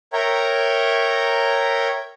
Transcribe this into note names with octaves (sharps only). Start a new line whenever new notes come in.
A#4 C#5 E5 G5 A#5